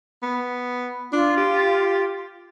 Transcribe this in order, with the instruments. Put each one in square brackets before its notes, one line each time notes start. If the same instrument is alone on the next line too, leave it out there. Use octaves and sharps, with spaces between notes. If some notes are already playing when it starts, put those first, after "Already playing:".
[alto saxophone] B3
[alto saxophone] D4 [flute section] F4
[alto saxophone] G4